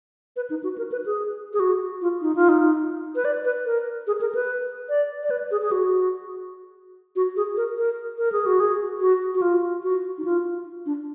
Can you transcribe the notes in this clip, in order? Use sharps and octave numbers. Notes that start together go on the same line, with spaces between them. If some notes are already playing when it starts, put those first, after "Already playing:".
B4
D#4
F#4
A#4
B4
G#4
G#4
F#4
F4
D#4
F4
D#4
B4
D5
B4
A#4
G#4
A#4
B4
D5
D5
B4
G#4
G#4
F#4
F#4
G#4
A#4
A#4
A#4
G#4
F#4
G#4
F#4
F#4
F4
F#4
D#4
F4
D4